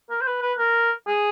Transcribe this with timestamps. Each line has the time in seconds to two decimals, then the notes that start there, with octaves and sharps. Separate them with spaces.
0.10 A#4
0.21 C5
0.27 B4
0.42 B4
0.58 A#4
1.07 G#4